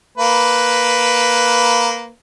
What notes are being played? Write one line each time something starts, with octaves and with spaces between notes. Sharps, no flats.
A#3 B4